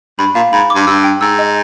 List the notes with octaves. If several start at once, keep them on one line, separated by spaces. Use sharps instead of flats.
G2 B5
A#2 F5
G#2 B5
D6
G2
G2 E6
G5
G#2 E6
D#5